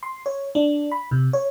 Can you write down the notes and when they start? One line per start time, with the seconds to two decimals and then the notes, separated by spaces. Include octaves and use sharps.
0.03 C6
0.26 C#5
0.55 D4
0.92 B5
1.11 C3
1.33 C#5